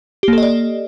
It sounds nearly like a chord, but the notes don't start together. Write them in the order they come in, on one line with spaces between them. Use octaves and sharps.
G4 A#3 A4 D#5 D5